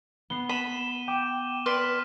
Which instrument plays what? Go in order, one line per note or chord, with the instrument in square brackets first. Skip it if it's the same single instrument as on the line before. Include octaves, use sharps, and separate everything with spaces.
[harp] B3 C7 [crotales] G7
[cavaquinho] B5 [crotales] D#7 E7
[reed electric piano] G5 [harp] D6
[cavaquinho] B4 D5 C6 [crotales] F6 B6